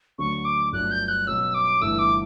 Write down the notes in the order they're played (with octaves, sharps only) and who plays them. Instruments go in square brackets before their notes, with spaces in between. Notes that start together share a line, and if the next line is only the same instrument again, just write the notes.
[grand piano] D2 D3 F#3 [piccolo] C#6
[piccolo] D6
[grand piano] G1 G2 F#3 A3 D4 [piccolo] F#6
[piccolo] G6
F#6
[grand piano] B2 F#3 C#4 [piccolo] E6
[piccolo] D6
[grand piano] G1 G2 E3 A3 [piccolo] E6
[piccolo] D6